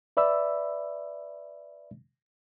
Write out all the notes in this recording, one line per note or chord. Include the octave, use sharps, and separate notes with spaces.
B4 D5 E5 B5 E6